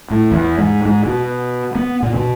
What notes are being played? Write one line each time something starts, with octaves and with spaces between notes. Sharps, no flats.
A2
E2
G#2
G#2
B2
B3
A#2
B2